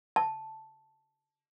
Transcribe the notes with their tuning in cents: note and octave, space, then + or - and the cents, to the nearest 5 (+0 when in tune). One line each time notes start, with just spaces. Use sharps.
A5 +0